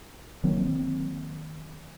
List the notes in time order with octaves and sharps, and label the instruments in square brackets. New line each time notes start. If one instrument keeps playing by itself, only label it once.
[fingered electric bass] D#3 F#3 A#3 C4